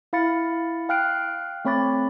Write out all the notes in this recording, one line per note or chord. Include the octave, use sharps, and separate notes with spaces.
E4 F5 B5 A6 C#7
F5 G5 F6 F#6 C7 D7
A3 C4 C#5 B5 D6 A6